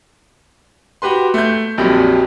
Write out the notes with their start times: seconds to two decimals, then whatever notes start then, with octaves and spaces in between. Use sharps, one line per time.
1.02 F#4 G4 B4 C6
1.34 A3 G6
1.78 A#1 F2 A#2 F#3 G3